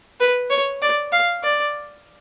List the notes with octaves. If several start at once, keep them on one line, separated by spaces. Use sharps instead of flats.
B4
C#5
D5
F5
D5